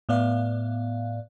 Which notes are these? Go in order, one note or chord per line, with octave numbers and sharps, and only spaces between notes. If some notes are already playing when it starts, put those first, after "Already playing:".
A2 B3 D5 F5